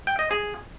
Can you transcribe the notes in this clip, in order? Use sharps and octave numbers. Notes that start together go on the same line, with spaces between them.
G5
D#5
G#4